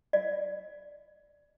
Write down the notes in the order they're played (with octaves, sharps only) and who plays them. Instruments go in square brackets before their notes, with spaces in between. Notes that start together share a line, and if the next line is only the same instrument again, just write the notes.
[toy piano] D5